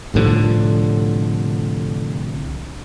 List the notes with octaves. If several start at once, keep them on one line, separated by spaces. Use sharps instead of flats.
C2 A2 D3 F3